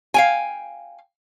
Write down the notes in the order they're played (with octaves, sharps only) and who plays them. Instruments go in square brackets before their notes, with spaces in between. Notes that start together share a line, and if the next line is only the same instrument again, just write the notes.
[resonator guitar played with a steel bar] F5 G5 G#5